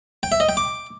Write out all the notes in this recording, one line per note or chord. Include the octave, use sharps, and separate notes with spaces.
G5
E5
D#5
G5
D6